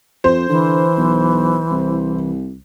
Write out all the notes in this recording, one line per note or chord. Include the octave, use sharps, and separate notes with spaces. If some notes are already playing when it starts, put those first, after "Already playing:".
F2 C5
D3 E3
B1
C2